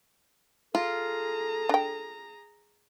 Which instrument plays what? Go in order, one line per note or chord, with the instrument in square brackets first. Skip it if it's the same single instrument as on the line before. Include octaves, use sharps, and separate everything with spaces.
[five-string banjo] F4 [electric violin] G#4 A#5 [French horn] A4
[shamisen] D4 G5